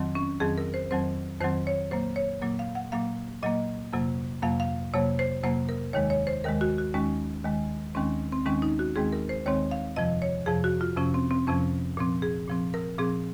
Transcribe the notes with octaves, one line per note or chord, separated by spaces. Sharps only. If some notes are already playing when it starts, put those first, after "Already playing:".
Already playing: F2 D#3 F#3 C4
C#4
F2 D#3 F#3 C4 G#4
A#4
C5
F2 D#3 F#3 C4 C5
F2 D#3 F#3 C4 C5
C#5
A#2 F#3 A#3 C5
C#5
A#2 F#3 A#3
F5
F#5
A#2 F#3 A#3 F5
A#2 F#3 A#3 D#5
F2 C3 F#3 A#3
F2 C3 F#3 A#3 F5
F5
F2 C3 F#3 A#3 C#5
C5
F2 C3 F#3 A#3 C5
A#4
D#2 D#3 G#3 C#5
C#5
C5
D#2 D#3 G#3 A#4
F#4
F#4
D#2 D#3 G#3 C#4
D#2 D#3 G#3
D#2 D#3 G#3 C4 C#4
C4
D#2 D#3 G#3 C4 C#4
D#4
F#4
D#2 D#3 G#3 C4 G#4
A#4
C5
D#2 D#3 G#3 C4 C#5
F5
F2 C3 F3 D#5
C#5
F2 C3 F3 G#4
F#4
F4
F2 C3 F3 C#4
C4
C4
F2 C3 F3 C#4
A#2 F3 C4
G#4
A#2 F3 C4
A#4
A#2 F3 C4 G#4